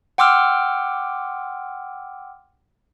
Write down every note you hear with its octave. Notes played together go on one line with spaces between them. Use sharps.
F#5 G5 C6 D6 E6 F6